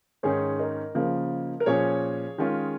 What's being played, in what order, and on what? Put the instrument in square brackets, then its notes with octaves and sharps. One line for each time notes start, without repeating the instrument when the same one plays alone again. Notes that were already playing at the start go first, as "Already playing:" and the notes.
[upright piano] G#2 D#3 C#4 [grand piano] G#4 C#5
[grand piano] A#4 D#5
[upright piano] C#3 F3 A#3
[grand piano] A#4
[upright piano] A#2 F3 C#4 [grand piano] G#4 C#5
[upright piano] D#3 G#3 C#4 F4